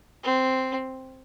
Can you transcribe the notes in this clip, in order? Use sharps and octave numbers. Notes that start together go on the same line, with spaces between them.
C4